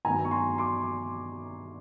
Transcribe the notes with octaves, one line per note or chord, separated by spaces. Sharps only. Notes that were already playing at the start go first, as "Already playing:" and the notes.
G2 D#3 F#3 B3 G#5 A#5
C#6
A#5 C6
C6 D6